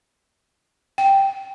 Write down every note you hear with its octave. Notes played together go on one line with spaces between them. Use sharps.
G5